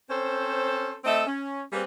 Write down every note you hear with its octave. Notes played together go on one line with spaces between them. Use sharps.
C4 C#4 A4 C5
A3 C4 A4 D#5 E5
C#4
G3 A#3 C4 G#4 B4